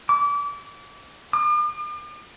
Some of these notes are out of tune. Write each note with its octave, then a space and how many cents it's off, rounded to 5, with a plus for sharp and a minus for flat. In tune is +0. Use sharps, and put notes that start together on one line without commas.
D6 -30
D6 +45